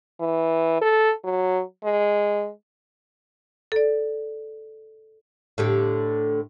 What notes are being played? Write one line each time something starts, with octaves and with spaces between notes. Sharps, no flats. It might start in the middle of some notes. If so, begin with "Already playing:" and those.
E3
A4
F#3
G#3
A4 D5
A2 D3 G4